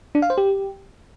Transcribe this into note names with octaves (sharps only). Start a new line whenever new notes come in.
D4
F5
C5
G4